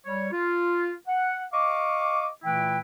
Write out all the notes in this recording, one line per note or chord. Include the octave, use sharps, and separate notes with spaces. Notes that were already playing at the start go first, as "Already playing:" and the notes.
G3 C#5
F4
F#5
D#5 F5 C#6 D6
A#2 E3 A3 E4 B4 G5